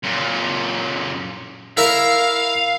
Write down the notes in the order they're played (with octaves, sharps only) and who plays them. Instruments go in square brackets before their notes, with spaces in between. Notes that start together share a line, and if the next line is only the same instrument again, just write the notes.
[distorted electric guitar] F#2 A#2
[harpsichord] E4 A#4 E5 [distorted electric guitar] F5